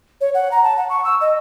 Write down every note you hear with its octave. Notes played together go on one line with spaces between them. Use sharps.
C#5
F#5
A#5
A5
F#5
C#6
E6
D#5